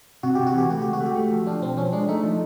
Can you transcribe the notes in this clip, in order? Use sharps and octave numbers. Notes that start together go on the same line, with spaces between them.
C3 F#4
C3 G4
F#4
E3 G4
A3 F#4
C#2 G4
F#4
A3
G4
A3 F#4
F3
F3 D4
B1 C4
F3 C#4
G#3 D4
A3 D#4
F3